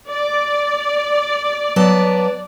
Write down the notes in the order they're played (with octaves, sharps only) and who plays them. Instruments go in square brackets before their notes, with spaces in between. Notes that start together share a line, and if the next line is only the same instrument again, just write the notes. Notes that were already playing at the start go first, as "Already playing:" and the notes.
[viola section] D5
[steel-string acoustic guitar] F#3 B3 A5